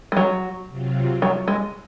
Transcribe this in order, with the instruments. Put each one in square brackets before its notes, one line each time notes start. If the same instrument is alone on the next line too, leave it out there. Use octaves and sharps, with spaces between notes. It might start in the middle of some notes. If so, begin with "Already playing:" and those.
[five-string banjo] G#3
F#3
[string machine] C3 F#3 C4 F4
[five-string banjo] F#3
G#3